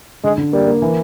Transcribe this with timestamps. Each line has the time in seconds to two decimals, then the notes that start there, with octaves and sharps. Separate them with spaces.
0.24 D3 G#3
0.38 D3
0.53 G3 A#3
0.67 A#3
0.82 E3